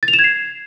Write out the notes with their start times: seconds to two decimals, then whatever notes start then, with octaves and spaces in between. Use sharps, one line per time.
0.03 A6
0.08 F7
0.13 E7
0.19 G#6
0.24 C7